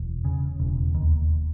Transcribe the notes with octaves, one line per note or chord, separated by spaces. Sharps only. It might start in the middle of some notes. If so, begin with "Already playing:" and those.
Already playing: E1
C#3
E1
D#2